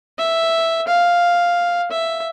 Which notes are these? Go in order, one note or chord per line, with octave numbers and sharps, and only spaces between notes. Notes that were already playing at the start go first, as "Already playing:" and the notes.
E5
F5
E5